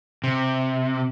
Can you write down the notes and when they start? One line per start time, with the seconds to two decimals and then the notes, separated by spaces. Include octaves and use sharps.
0.24 C3